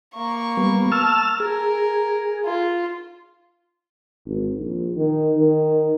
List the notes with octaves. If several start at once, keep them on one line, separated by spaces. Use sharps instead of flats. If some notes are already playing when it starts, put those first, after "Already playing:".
A#3 C#6
G3 B3
A5 E6 F6
G#4 A#4
F4
G#1
A#1
D#3
D#3